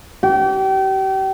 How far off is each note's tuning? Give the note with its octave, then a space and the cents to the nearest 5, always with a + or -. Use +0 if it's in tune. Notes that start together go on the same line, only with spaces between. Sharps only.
G4 -35